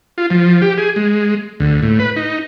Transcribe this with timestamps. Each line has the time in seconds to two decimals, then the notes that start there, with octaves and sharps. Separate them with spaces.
0.18 F4
0.30 F3
0.62 G4
0.78 G#4
0.96 G#3
1.60 D2
1.83 A2
2.00 B4
2.16 D#4